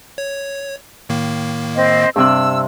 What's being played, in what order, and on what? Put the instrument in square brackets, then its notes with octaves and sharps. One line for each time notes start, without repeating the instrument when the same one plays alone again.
[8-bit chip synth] C#5
A2 D#3 A#3
[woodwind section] C4 D#5
[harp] G2 C3 F#6 [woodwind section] E6